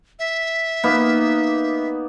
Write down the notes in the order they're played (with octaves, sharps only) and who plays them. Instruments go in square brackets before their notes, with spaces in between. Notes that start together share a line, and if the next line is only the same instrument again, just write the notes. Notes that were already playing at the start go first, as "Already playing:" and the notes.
[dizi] E5
[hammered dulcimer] A#3 B3 D#4